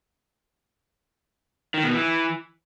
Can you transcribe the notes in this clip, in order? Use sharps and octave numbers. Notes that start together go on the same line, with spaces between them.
D#3
B2
E3